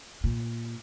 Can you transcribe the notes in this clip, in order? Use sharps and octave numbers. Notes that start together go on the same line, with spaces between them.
A#2